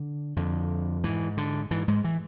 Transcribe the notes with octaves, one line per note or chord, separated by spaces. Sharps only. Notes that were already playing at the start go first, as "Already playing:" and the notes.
Already playing: D3
F2 D3
G#2 E3
D3
G#2 E3
G#2 G#3
E3